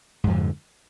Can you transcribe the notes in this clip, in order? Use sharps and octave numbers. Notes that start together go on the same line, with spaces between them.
F2 G#2 D3 F3